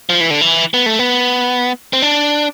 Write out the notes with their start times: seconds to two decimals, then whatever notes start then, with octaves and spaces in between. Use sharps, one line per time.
0.10 F3
0.20 E3
0.30 D3
0.41 E3
0.74 B3
0.86 A3
0.99 B3
1.93 C4
2.02 D4